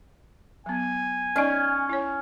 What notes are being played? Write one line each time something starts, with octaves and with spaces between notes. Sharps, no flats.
F#3 B3 G#5
C#4 D#4 D5 D#5
E4 C#5